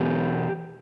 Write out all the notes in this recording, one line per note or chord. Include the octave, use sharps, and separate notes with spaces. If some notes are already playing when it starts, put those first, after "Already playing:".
Already playing: E2 B2 G4